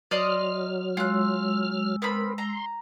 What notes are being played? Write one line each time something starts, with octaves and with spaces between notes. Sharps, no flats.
F#3 D5 D#5 C6 F6
G#3 F4 E6 F#6
B3 C4 A#4 B5
A#5 C6